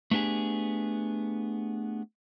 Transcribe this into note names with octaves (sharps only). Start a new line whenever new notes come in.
A3 B3 D4 G4 G#4